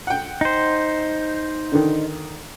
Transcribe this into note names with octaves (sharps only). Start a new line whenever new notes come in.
F#5 G5
D#4 C5
D3 D#3